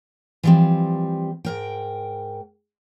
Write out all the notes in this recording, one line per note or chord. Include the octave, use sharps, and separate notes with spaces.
E3 F3 G3 A#3 C4
G#2 A#4 G5